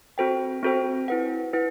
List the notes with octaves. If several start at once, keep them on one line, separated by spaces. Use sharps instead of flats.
C4 F#4 A4 C5 G5
C4 F#4 A4 C5 G5
E4 B4 F#5
E4 B4 F#5